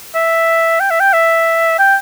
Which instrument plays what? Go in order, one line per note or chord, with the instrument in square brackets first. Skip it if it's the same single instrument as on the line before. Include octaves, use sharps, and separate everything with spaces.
[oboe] E5
G5
E5
G5
E5
G5